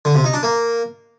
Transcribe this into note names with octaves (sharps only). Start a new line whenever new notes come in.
D3
C3
D#4
D4
A#3